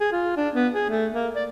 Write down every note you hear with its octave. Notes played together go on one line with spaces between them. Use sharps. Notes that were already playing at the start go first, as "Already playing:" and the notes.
G#4
F4
D4
B3
G#4
A3
A#3
D5